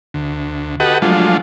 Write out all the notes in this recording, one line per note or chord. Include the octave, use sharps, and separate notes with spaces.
D2
F#4 G4 A4 B4 D#5 F#5
F3 F#3 G#3 A3 D4 F4